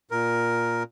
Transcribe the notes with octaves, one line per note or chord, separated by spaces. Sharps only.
A#2 A#4